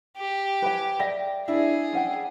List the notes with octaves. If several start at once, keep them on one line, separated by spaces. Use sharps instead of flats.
G4
B4 G5 G#5
D5 E5 G5 A#6
D4 E4 G#4
C#4 F#5 G5